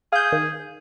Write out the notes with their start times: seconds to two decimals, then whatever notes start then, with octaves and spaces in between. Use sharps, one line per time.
0.13 G#4 F5 G6
0.32 D#3